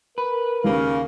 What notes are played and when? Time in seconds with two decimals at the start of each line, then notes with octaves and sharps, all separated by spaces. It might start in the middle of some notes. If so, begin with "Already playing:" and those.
0.18 A#4 B4
0.64 D#2 C#3 A#3